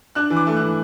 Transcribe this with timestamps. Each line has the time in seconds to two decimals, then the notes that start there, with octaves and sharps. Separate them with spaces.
0.15 D4 F#6
0.30 E3
0.36 D6
0.47 A3
0.57 E3 F#6